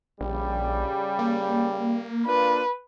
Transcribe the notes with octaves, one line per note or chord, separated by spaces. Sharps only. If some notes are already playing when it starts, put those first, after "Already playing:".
A#1 C#3 G3
A#3
A#3 D4 F4 B4